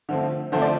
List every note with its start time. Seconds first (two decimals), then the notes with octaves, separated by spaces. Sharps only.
0.09 D3 F3 A3 C4
0.52 D3 F3 A3 C4 C5
0.62 D5